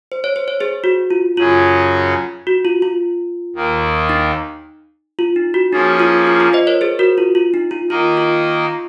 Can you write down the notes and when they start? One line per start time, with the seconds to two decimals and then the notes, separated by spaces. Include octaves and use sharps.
0.12 C5
0.24 C#5
0.36 C5
0.48 C#5
0.60 G#4 C5
0.84 F#4
1.10 F4
1.37 F#2 C#3 F#3 C#4 F4 G#4
2.47 F#4
2.65 F4
2.82 F4
3.55 D#2 D#3 A#3
4.09 D#4
5.19 F4
5.36 D#4
5.54 F#4
5.72 F3 A#3 C#4 D#4 G#4
6.00 F4
6.27 F4
6.40 F4
6.53 C5 D#5
6.67 A#4 C#5
6.81 G#4 C5
6.99 F#4 A#4
7.18 F4
7.35 F4
7.54 D#4
7.71 F4
7.89 D#3 A#3 D#4 F4 A#4
8.17 F4